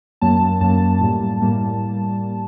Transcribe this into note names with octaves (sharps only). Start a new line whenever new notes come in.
F#2 F#3 A#3 A5
F#2 F#3 A#3 A5
A2 G3 A#3
A2 G3 A#3